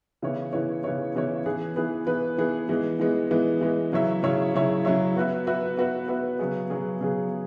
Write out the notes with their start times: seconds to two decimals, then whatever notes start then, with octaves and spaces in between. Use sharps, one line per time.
0.22 C#3 E3 B3 E4 C#5
0.53 C#3 E3 B3 E4 C#5
0.84 C#3 E3 B3 E4 C#5
1.15 C#3 E3 B3 E4 C#5
1.46 E3 B3 G#4 B4
1.76 E3 B3 G#4 B4
2.07 E3 B3 G#4 B4
2.38 E3 B3 G#4 B4
2.69 E3 G#3 B3
3.00 E3 G#3 B3
3.31 E3 G#3 B3
3.61 E3 G#3 B3
3.92 C#3 F#3 E4 C#5 E5
4.23 C#3 F#3 E4 C#5 E5
4.54 C#3 F#3 E4 C#5 E5
4.85 C#3 F#3 E4 C#5 E5
5.16 B3 F#4 B4 E5
5.47 B3 F#4 B4 E5
5.77 B3 F#4 B4 E5
6.08 B3 F#4 B4 E5
6.39 C#3 F#3 B3 G#4
6.70 C#3 F#3 B3 G#4
7.01 C#3 F#3 B3 G#4